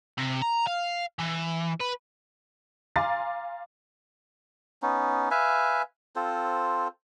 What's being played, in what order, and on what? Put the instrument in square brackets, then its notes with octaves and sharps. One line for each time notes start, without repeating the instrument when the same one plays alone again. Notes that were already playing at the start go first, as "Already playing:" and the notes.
[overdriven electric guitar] C3
A#5
F5
E3
B4
[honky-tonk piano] F5 G#5 A#5 C6 D6 A6
[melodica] B3 C#4 D#4
B4 E5 F5 G#5
C4 F4 A4 C5